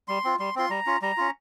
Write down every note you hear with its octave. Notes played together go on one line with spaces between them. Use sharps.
G3 C6
C4 F4
G3 C6
C4 F4 C6
G3 A#5
C#4 F4
G3 A#5
C#4 F4